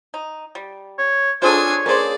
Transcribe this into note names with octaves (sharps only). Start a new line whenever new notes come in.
D#4
G3
C#5
D4 F4 G#4 A4 C5 C#5 G#5
A#3 C#4 G#4 C5 D5 D6